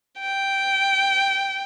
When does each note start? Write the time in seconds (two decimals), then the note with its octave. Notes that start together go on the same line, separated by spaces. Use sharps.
0.21 G5